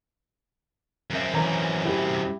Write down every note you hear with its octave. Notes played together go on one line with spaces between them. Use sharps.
F#2 C4 C#4 E5
E3 C#5 A#5
E4 G4